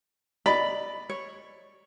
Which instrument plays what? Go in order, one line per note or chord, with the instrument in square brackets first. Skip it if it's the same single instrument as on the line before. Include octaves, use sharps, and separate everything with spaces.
[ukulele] D5 D#5 [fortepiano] B5
[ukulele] C#5